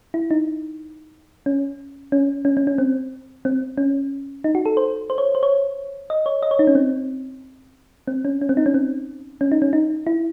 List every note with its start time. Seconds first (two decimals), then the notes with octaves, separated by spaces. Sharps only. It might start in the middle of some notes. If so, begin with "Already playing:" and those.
0.14 E4
0.31 D#4
1.46 C#4
2.12 C#4
2.45 C#4
2.57 C#4
2.67 C#4
2.78 C4
3.45 C4
3.77 C#4
4.44 D#4
4.55 F#4
4.65 A4
4.77 C5
5.10 C5
5.18 C#5
5.35 C5
5.43 C#5
6.10 D#5
6.26 C#5
6.42 D#5
6.51 C#5
6.59 D#4
6.67 C#4
6.75 C4
8.08 C4
8.25 C#4
8.41 C#4
8.49 C4
8.57 D#4
8.66 C#4
8.74 C4
9.41 C#4
9.52 D#4
9.62 C#4
9.73 D#4
10.07 E4